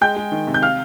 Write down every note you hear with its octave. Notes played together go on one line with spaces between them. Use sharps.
G#3 G5 G6
G#3
D#3
C3
G6
F5 F6